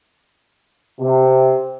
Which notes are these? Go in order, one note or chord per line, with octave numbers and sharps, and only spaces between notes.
C3